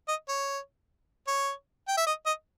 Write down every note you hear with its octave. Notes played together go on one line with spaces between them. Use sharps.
D#5
C#5
C#5
G5
E5
D#5
D#5